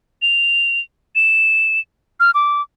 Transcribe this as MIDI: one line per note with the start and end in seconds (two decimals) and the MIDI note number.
0.22 0.80 101
1.15 1.80 100
2.20 2.31 89
2.34 2.62 86